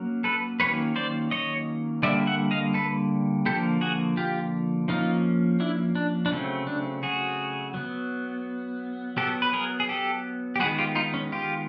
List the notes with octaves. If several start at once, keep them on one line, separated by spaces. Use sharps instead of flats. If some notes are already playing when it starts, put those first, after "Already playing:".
Already playing: F#3 A#3 C#4
A4 B4
D#3 F#3 A#3 C#4 B4 C#5
C5 D5
C#5 D#5
D3 G3 A#3 D5 E5
E5 F#5
D#5 F5
A4 B4
D3 F3 A#3 G4 A4
F#4 G#4
F4 G4
F3 A#3 C#4 D#4 F4
D4 E4
D4
D4
C#3 F#3 A3 C4 C#4
D4
F#4 G#4
F#3 B3
F#3 B3 G4 A4
B4
G#4 A#4
G#4
G4 A4
G4
D#3 G#3 B3 F#4 G#4
F4 G4
D#4 F4
C#4
F4 G4